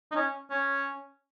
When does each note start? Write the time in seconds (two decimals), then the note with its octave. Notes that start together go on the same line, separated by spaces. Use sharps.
0.12 D#4
0.16 C#4
0.51 C#4